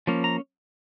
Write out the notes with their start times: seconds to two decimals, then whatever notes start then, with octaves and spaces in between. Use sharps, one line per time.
0.07 F3 A#3 C#4
0.24 A#5